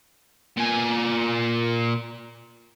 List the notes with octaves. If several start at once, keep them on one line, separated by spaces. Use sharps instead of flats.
A#2 G#5